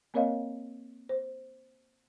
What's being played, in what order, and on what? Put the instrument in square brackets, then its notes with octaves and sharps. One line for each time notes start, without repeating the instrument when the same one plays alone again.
[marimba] A#3 C4 A#4 C#5 D#5 F5
C5